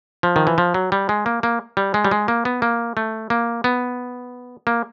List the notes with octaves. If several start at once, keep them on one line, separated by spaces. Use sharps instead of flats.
F3
D#3
E3
F3
F#3
G3
G#3
A#3
A#3
G3
G#3
G3
G#3
A#3
B3
A#3
A3
A#3
B3
A#3